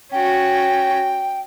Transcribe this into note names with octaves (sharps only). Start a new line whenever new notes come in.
C#4 F#4 G5